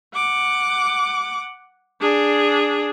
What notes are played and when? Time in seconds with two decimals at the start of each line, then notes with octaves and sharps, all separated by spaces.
0.15 F#5 D6
2.01 D4 G#4